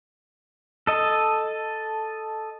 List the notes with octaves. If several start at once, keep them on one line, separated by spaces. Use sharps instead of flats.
A4 D#5